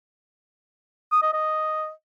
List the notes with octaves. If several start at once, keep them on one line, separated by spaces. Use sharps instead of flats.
D#6
D#5
D#5